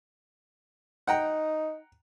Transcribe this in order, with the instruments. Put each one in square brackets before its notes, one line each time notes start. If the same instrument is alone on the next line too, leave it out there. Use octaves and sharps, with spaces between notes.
[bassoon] D#4 [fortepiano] F#5 G5 A#5